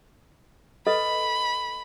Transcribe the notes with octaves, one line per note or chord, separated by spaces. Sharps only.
A4 B4 D#5 B5